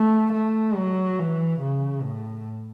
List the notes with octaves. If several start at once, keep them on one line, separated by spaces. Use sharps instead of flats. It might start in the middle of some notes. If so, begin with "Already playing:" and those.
Already playing: A3
A3
F#3
E3
C#3
A2